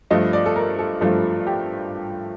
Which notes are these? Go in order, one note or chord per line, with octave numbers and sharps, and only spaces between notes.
G2 F3 A3 D#5
D5
A4
A#4
A4
G2 F3 A3 A4
G4